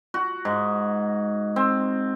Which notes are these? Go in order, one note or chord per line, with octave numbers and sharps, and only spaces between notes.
F#4
G#2
C4